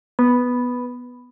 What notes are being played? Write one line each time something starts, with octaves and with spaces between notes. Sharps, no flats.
B3